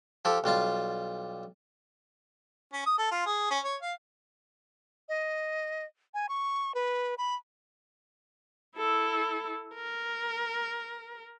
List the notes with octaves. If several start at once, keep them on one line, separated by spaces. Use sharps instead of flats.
F3 G4 A4
B1 G3 F4 A5
C#4
D#6
A4
F4
G#4
C#4
C#5
F5
D#5
G#5
C#6
B4
B5
E4 A4
A#4